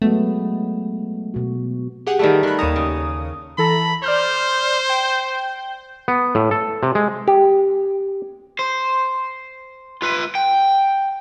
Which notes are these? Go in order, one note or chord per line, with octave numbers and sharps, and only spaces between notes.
F#3 G#3 A3 B3
B2 F#4
G4 G#4 F#5
D#3 G3 A3
D#3 B5 F#6
D#2 C#5 A5 A#5 D#6
C#3
E3 A4 A#5 B5
C5 D5 F6 G6
G5 G6
B3
A2
A4
C3
G#3
G4
C5
F4 B4
G5